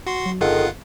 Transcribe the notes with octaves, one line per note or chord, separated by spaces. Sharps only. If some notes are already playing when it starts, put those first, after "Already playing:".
F#4 C6
F#3
G1 D#3 F4 G#4 A4 F5 F#5